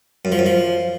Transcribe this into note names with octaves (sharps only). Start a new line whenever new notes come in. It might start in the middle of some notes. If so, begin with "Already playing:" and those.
F#2
F3
F#2
F3